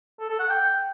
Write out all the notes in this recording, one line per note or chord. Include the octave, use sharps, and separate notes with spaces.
A4
A4
F#5
G5